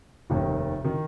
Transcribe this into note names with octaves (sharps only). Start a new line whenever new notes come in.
F1 D#2 D#3
D#3